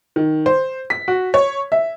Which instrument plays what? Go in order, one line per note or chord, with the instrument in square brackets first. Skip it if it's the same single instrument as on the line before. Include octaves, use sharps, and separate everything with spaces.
[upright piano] D#3
C5
B6
F#4
C#5
E5